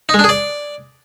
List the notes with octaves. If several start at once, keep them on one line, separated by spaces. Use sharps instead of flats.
D#4
G#3
D4
G#4
D5